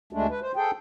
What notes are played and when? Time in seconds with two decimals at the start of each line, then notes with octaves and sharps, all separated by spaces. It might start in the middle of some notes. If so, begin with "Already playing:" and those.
0.13 D2 G#3 A3 D4
0.30 B4
0.42 C5
0.56 G#4 A4 G5